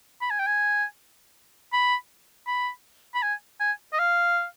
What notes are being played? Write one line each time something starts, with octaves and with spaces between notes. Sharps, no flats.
B5
G#5
G5
G#5
B5
B5
B5
G#5
G#5
D#5
F5